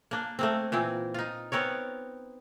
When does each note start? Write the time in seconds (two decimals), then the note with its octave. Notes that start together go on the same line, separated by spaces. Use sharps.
0.11 A#3 D4
0.39 A3 A#3 C4
0.72 A#2 E3 C4
1.14 D#4 F4
1.52 B3 C4 A#4 C#5